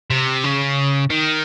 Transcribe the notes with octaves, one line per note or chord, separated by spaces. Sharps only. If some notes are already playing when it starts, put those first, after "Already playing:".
C3
C#3
D#3